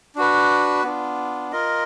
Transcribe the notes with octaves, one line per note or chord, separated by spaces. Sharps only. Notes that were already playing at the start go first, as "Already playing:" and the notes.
D4 F#4 B4
B3 D4 F4
F4 A#4 D#5